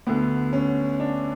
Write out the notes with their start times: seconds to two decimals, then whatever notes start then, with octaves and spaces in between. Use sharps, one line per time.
0.07 D2 D3 B3
0.53 C#4
1.00 D4